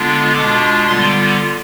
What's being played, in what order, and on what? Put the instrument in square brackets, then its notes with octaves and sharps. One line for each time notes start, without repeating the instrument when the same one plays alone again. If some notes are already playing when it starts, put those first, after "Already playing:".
Already playing: [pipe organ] D3 G#3 B3 D4 F4
B2 G#3 D4 F4 D6
D3 G3 B3 F4 C6